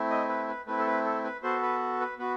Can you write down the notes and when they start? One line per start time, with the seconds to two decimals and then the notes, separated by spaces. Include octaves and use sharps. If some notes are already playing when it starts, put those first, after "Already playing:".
Already playing: A3 C4 E4
0.10 D#5
0.29 B4
0.48 B4
0.67 A3 C4 E4 B4
0.79 A4
0.86 B4
1.05 A4
1.24 B4
1.43 B3 F#4 A4 C5
1.62 B4
2.01 B4
2.19 B3 F#4 B4